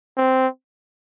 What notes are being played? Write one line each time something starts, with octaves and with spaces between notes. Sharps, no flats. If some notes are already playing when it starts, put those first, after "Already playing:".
C4